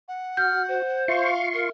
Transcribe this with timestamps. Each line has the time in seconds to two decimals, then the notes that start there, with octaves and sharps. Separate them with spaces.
0.08 F#5
0.37 F#4 F6 G6
0.68 C5
1.08 F4 E5 F5 C6 C#6
1.53 A#4